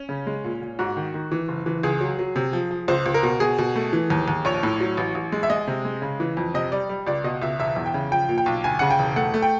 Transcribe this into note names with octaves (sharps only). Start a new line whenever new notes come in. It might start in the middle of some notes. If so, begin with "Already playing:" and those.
Already playing: C#4
C#3
G#3
A#2
A#2
G#2 F#4
D#3
D#3
E3
F#1
E3
C#2 G#4
F#3
F#3
C3
F3
F3
C#2 C5
C#2
A#4
B2
B2 G#4
B2
A3
E3
D#2
D#2
A#1 C#5
A2
F#3
A1
A1
G#3
E5
G#3 D#5
C3
G#3
C#3
E3
F2
C3 D#5
G3 D5
G3
C#2 D5
B2 D#5
C#2 E5
E1 E5
E2
G5
C#3
F3 G5
A#2
G5
B1
D2 G#5
C#3 F#5
G5
E1
A3 F#5
A3
G5